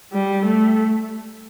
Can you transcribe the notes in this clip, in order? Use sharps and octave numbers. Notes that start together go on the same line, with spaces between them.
G3
A3